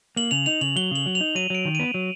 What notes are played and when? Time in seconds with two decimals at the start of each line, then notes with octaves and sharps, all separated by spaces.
0.16 A#3 F#7
0.31 C#3 F7
0.46 D#4 F7
0.61 C#3 F#7
0.76 F#3 G7
0.91 C#3 F#7
1.06 F#3
1.15 F7
1.21 D#4
1.35 F#3 D#7
1.50 F#3 D7
1.65 D#3
1.75 B3 D#7
1.94 F#3